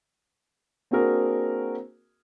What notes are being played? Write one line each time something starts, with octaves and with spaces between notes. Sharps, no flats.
A#3 C4 D4 F#4 G#4 A#4